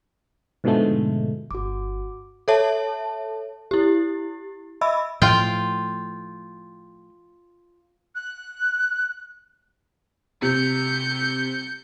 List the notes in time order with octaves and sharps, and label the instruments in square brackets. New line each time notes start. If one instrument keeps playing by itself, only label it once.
[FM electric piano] G#2 B2 D3 F3 G#3 A3
[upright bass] G1 [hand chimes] F#4 D6
[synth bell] A4 C#5 E5 A5
E4 G4
D#5 E5 B5 E6
[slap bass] A2 F3 A3 [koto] F4 G5
[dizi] F#6
[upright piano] C3 [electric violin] G6 C#7